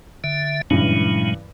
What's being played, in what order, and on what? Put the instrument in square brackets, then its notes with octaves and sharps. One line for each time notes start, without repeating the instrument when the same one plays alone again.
[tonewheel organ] D3 E5
[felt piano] G2 C#3 E3 [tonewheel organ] A#2 F#3 G#3